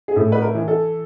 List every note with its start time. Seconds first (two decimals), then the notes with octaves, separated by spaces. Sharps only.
0.08 G#4
0.16 A2 A4
0.32 B4
0.42 A#4
0.55 E3
0.68 A4